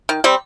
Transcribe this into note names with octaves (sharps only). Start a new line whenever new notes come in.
D#3
G3 C4